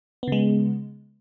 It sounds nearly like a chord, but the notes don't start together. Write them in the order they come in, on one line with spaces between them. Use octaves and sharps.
B3 C#3 G#3